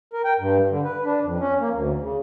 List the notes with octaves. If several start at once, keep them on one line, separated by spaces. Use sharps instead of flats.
A#4
G5
G2
D3
B4
D4
F2
C#4
A#3
D2
C#3